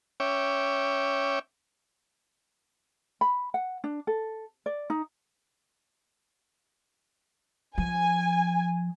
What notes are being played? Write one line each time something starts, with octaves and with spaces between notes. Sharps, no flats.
C#4 C#5 E5 G5 D6
B5
F#5
D4
A4
D5
D#4
F3 G#5